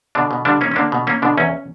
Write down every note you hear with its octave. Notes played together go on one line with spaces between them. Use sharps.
B2 D3 D4
B2
D3 G3 D4
A#3 C#4
C#4
D3 A#3 D4
B2
A#3 C#4
B2 D3 D4
E2 C#4